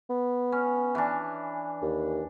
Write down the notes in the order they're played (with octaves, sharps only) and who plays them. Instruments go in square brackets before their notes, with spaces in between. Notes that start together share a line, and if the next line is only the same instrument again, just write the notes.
[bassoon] B3
[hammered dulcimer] C#4
E3 D4
[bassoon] D#2